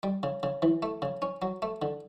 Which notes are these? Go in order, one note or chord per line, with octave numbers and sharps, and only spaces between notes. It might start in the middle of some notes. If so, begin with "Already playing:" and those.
G3
C#3
C#3
E3
A3
C#3
C#4
F#3
A3
D3